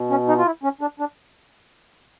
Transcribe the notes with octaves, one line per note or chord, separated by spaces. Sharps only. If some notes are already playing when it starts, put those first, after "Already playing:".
Already playing: B2
C#4
D#4
F4
E4
C#4
D4
D4